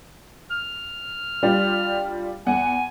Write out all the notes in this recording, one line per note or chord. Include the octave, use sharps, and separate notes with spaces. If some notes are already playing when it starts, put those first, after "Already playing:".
F6
G3 D4 F4
E2 F#5 G#5